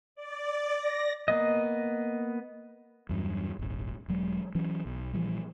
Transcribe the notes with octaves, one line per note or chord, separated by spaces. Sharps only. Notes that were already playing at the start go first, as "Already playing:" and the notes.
D5
A#6
A#3 B3 D#5
E2 G2 F#3
D#1 G#1
E1 F#3 G#3
E3 F#3 C#4
B1
A#2 E3 F3 G3